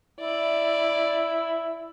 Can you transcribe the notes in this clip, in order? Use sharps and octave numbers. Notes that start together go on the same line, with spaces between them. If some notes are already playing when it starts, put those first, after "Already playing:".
E4 D5